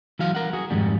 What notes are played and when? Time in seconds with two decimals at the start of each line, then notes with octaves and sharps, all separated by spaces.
0.19 E3 F#3 F#4 F5
0.35 A#4 F#5
0.53 F#4 G#4
0.70 F2 G#2 D#3 G3